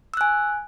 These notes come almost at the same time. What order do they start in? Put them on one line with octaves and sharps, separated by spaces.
E6 F#6 G#5